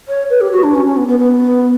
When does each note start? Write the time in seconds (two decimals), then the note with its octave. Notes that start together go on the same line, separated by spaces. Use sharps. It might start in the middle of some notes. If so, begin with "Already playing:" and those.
0.08 C#5
0.30 B4
0.41 G4
0.52 F#4
0.63 D4
0.74 C#4
0.86 C#4
0.97 B3
1.07 B3
1.19 B3